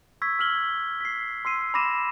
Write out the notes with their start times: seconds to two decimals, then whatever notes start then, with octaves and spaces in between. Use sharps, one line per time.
0.22 C#6 E6 G#6 B6
0.39 E6 F6 F#7 G7
1.00 B6 C7
1.45 C6 E6 C7 D#7
1.74 B5 C6 D6 A#6 D#7 E7